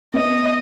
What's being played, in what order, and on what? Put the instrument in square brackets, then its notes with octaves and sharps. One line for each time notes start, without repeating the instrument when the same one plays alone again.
[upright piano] B3 [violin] D#5